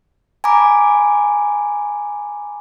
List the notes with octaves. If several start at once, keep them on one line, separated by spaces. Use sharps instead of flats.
G#5 A#5 B5 D6